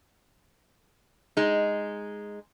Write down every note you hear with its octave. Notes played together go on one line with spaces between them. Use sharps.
G#3 D#4